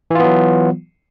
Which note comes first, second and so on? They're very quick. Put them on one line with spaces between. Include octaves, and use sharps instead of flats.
E3 F4 B3 F#3